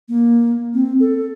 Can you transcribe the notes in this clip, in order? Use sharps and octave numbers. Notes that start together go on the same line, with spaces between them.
A#3
C4
A4